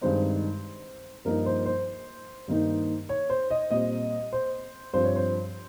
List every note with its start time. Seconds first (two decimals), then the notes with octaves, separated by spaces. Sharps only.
0.01 G2 D#3 G#3 C4 D#4 C5
1.25 G2 F3 A#3 D#4 A#4
1.46 C5
1.66 C5
2.48 G2 D#3 A#3 D#4
3.09 C#5
3.30 C5
3.51 D#5
3.71 A#2 G3 C4 D#5
4.33 C5
4.94 G2 F3 C4 C5
5.04 C#5
5.16 C5